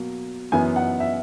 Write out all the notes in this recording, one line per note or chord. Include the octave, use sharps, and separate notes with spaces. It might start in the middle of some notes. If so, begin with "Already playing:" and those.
Already playing: B2 F#3 A#3
F#2 E3 B3 G#5
F#5
E5